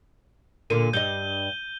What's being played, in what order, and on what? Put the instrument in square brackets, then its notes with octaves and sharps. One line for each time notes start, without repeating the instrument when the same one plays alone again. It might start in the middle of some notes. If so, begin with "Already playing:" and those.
[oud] A#2 D3 A#3 [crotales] D#7
[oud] G2 G3 D#5 [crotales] G6 G7